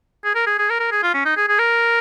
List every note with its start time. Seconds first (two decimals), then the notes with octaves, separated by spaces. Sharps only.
0.24 G#4
0.35 A#4
0.46 G#4
0.58 G#4
0.69 A#4
0.80 A#4
0.91 G#4
1.03 F4
1.14 C#4
1.25 D#4
1.36 G#4
1.48 G#4
1.59 A#4